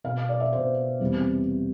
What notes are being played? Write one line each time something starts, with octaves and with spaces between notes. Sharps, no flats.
B2 B3 F5
D5
E5
B2 B3 C5
E2 C3 G3 B3